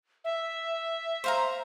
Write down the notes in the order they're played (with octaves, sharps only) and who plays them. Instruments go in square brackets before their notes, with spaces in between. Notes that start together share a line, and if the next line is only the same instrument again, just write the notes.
[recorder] E5
[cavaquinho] C5 F5 A#5